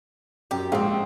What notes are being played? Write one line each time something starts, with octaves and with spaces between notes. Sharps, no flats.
F#2 G4
A#1 G#2 C4 D#4 F5